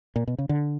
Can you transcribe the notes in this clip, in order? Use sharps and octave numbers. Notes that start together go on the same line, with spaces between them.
A#2
B2
C#3
D3